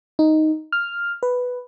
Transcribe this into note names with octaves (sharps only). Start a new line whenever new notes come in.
D#4
F6
B4